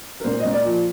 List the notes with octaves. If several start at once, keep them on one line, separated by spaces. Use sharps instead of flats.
A#4
A#2 C5
A#2 D#5
D5
F3